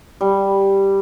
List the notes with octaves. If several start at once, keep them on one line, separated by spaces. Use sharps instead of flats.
G3